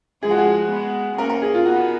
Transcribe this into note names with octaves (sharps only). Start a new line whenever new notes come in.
F3 G#3 G#4
F#4
G#4
G#3 B3
A#3 C#4 A#4
A#4
G#4
F4
B3 D#4 F#4